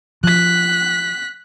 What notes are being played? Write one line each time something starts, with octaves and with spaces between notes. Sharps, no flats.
F3 F#6 B6